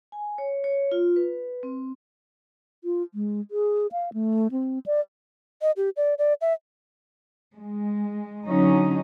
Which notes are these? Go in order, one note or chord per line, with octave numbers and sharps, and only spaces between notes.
G#5
C#5
C#5
F4
B4
C4
F4
G#3
G#4
F5
A3
C4
D5
D#5
G4
D5
D5
E5
G#3
D3 F#3 C#4 D#4